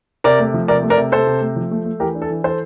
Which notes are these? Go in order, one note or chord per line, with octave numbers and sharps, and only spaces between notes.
C3 A#4 D5
A3
F3
C3 A#4 D5
A3
A#4 D5
C3
C3 A4 C5
C3
A3
F3
A3
A3
E3 G4 A#4
D4
A4
E3
E3 A4 C5